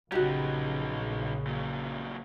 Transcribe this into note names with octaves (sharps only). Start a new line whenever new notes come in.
A#1 C#3 F#3 D#4 F#4 G4
A#2 F#3